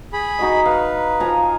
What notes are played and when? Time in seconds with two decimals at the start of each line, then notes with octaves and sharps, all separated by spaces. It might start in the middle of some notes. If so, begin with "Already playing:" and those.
0.13 G#4 B5
0.39 D#4 F#4 D#5
0.65 B4 F5
1.20 F3 G#5 A#5